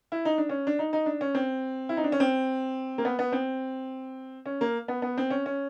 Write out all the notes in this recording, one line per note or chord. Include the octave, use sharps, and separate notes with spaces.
E4
D#4
D4
C#4
D4
D#4
D#4
D4
C#4
C4
E4
D#4
D4
C#4
C4
A#3
B3
B3
C4
C#4
A#3
B3
B3
C4
C#4
C#4